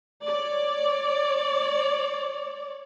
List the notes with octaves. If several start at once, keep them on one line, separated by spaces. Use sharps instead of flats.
C#5 D5